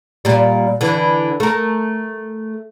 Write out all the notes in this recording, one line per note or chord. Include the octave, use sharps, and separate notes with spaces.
A#2 G3
D3 E3
A3 A#4